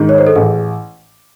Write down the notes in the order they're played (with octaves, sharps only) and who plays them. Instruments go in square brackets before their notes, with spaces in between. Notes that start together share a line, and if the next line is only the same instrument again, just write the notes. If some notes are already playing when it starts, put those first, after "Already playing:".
Already playing: [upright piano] G#2 D#3 [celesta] G#4
[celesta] C#5
C5
A4
[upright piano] A1 [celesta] G#4